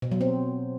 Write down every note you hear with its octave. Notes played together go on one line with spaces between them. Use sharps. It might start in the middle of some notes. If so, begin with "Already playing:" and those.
B2
F#3
C4